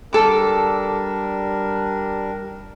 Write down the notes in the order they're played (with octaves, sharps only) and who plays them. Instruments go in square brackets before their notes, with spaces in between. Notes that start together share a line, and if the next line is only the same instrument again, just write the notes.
[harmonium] G3 D4 A#4 [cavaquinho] A4 D6